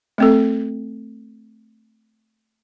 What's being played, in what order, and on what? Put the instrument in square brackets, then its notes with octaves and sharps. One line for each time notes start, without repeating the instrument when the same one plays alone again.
[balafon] A3 C4 A4